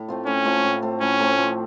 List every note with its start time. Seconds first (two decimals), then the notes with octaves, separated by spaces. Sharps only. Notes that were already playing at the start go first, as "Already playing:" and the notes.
Already playing: A2
0.08 A3 C4 F4
0.27 A2 C#4
0.45 A3 C4 F4
0.64 A2
0.82 A3 C4
1.01 A2 C#4
1.20 A3 C4
1.38 F3